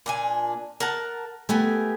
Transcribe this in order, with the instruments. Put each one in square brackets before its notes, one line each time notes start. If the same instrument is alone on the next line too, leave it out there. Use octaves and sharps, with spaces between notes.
[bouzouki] A#2 D4 G#5
A#4 F#5 A5
[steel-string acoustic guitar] A3 A#4 [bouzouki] B3 G4 G#5